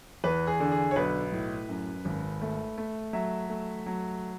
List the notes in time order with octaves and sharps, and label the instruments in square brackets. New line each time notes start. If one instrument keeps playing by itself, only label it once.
[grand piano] E2 B4
G#4
D3
G#4
C#5
B1 B4
A2
F#2
G#1
A3
A3
F#3 E5
A3
F#3